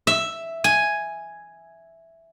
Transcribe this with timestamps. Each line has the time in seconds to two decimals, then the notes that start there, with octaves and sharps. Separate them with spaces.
0.07 E5
0.64 G#5